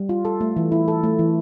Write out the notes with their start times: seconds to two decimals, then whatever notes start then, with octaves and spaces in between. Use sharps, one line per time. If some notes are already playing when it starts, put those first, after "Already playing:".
Already playing: G3
0.09 F4
0.25 A4
0.41 A3
0.57 E3
0.72 E4
0.88 A4
1.04 A3
1.19 E3